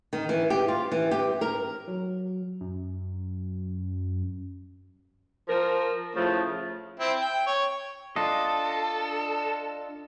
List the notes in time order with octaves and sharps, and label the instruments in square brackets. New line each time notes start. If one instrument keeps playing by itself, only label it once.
[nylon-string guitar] D#3
E3
G4
F4
E3
G4
A#4
[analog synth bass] F#3
F#2
[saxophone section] F3 A#4
A2 C#3 F3 A3
[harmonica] C4 E4
G5
C#5
[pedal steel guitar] D4 F4 D#5 [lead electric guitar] A4